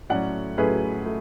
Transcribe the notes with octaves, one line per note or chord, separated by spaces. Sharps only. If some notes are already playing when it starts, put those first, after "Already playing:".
A2 F#3 A3 C#4 D5 F#5
A2 F#3 A3 C#4 G#4 B4
A3